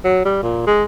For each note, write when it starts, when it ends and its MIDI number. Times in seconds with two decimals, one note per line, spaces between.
0.04 0.23 54
0.25 0.42 55
0.42 0.66 46
0.67 0.83 56